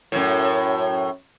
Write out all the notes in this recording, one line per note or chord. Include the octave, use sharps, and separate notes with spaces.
F#2 A2